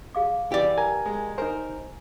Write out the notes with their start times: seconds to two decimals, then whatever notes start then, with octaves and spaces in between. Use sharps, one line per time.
0.15 G#4 F5 D6
0.52 E3 G4 D5
0.77 A#4 G#5 A#5
1.06 G#3
1.38 D#4 A#4 C5 G#5